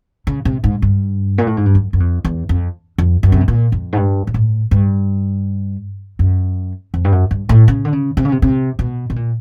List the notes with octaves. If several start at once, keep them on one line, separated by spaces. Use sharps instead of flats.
C#3
C3
G#2
G2
A#2
A2
G#2
G2
F#2
F#2
F2
E2
F2
F2
F#2
C3
B2
A#2
F2
G#2
G2
G#2
A2
G2
F#2
F2
G2
F#2
G2
A2
C#3
D3
C#3
C3
C#3
C3
C3
B2
B2
A#2